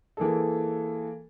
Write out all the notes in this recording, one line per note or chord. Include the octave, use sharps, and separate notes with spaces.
E3 A#3 G#4 A4